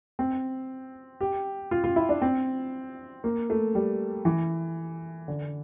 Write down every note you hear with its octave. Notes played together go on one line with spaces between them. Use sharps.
C4
G4
F4
F4
E4
D4
C4
A#3
A3
G3
E3
D3